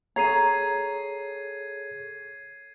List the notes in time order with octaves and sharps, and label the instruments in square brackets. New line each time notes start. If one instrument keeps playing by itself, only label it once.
[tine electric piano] G#4 A4 C#5 [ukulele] A#5 [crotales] G#6 C7 D#7